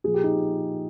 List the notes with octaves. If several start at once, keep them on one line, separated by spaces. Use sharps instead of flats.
A#2 F3 G#4
G4
D#4